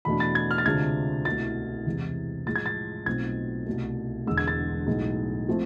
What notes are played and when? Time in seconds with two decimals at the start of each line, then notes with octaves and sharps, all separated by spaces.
0.05 E2 B2 A3 D4 B5
0.20 A6
0.35 G#6
0.51 F6
0.58 A6
0.66 D2 C3 G#3 D4 F4 G#6
1.25 C2 B2 A3 E4 A6
1.86 E2 C3 E3 G#3
2.46 A2 F3 G#3 A6
2.56 G#6
2.66 A6
3.06 B1 B2 A3 C4 F4 G#6
3.66 C2 B2 A3
4.26 E1 E2 D3 G#3 E6
4.37 G#6
4.48 A6
4.86 B1 A2 G#3
5.49 F3 A3 C4